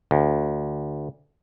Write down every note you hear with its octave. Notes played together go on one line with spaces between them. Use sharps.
D2